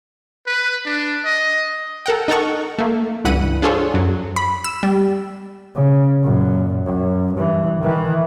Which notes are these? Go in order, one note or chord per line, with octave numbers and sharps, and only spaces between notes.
B4
D4
D#5
A4 A#4 F#5 G5
D#4 A4 A#4 F#5 C#6
A3 A#3
C#2 G2 E3 F#5 B5 D#7
D4 F4 G#4 A4 C5 C#5
F#2 F#3
B5
E6
G3
C#3
F#2 A#2
F#2
G2 E3
D#3 E3